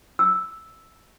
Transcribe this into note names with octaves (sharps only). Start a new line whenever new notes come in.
E6